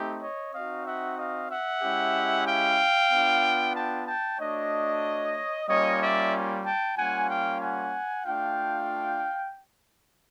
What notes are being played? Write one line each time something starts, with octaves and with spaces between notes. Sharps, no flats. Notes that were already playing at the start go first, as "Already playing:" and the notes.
Already playing: A3 C4 D#4 G4
C#5 D#5
C4 D#4 F#4 D#5 F5
E5 F#5
D#5 F5
E5 F#5
G#3 C#4 E4 G4
F5 G5
B3 D4 F4
G5 A5
G5 A5
A3 D4 F#4 C#5 D#5
G3 A#3 C#4 F4 C#5 D#5
D5 E5
G5 A5
G3 A#3 C#4 F4 F#5 G#5
F5 G5
F#5 G#5
A3 D4 F4 F5 G5